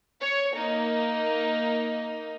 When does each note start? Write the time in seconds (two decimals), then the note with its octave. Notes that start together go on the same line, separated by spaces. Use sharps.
0.22 C#5
0.55 A#3 D#4